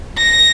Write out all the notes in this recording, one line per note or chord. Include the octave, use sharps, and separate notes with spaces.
A#6